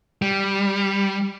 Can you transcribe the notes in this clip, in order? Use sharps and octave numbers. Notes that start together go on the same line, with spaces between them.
G3